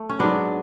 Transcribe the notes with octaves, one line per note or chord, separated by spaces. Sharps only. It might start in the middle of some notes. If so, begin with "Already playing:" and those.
Already playing: A3
C#4
G#2 F#3 B3 D4